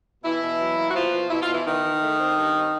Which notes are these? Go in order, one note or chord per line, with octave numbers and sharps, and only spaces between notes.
B2 E3 E4
B2
F#3
A#3
F#4
B2 F3 F4
B2
B2 E4
F4
B2 E3 E4
D#3 E3 D#4
E3
A3
C4
G2
C4